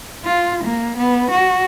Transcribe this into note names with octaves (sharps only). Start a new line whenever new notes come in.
F4
A#3
B3
F#4